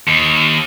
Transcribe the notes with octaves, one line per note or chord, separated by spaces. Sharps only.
D#2